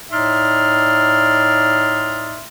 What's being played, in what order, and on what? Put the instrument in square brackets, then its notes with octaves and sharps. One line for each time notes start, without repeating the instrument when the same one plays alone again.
[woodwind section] A2 D#4 D5 E5 C6 F6